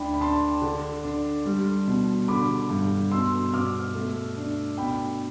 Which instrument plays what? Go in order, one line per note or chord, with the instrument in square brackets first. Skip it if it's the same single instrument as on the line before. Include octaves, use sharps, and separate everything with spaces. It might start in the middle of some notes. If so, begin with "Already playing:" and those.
Already playing: [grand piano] D2 D4 G5 B5
B5
D4 A5 C6
D3
D4
G3
B2
D3 B5 D6
G2
B2 C6 E6
B2 D6 F6
A3
D4
B2 G5 B5